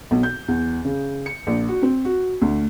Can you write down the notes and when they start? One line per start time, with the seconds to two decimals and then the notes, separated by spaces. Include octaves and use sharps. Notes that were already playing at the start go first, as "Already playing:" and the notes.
0.11 B1
0.23 G6
0.48 E2
0.85 C#3
1.26 C#7
1.47 A#1
1.68 F#4
1.82 C4
2.05 F#4
2.42 D2